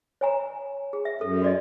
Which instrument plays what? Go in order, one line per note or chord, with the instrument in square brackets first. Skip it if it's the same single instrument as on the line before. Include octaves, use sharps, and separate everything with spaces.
[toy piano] C#5 G#5 A#5
G#4
E5
[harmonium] F#2 [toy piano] A4
[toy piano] F#4 D5 D#5